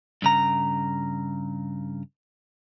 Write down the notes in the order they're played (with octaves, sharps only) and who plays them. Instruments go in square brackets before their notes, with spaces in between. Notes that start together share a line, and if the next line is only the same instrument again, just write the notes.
[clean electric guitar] G2 C#3 A#5